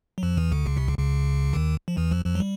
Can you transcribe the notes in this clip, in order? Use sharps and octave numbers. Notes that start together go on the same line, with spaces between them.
F#3
F2 F3
E2 E3
D2 D3
C#2 C#3
C2 C3
C#2 C#3
C#2 C#3
D#2 D#3
F3
E2 E3
F2 F3
F2 F3
F#3
G3